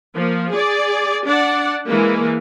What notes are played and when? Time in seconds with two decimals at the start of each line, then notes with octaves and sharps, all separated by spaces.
0.14 F3 A#3
0.51 G#4 D5
1.26 D4 D5 F#5
1.88 E3 G#3 A#3